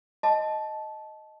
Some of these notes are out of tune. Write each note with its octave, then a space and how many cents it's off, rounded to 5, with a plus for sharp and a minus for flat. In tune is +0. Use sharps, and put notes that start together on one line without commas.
D#5 +0 A5 -15